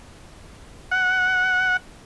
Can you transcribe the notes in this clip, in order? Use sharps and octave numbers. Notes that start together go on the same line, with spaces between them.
F#5